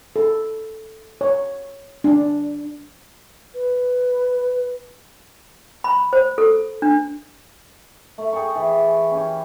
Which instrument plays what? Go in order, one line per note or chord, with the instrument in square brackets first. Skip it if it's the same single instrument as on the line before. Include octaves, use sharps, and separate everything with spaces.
[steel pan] A4
C#5
D4
[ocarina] B4
[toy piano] B5
C5
A4
D4
[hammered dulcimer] A3
G#4 D5 G5 C#6
E3
C#4 G4